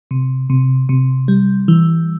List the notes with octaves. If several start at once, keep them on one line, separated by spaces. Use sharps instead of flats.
C3
C3
C3
G3
E3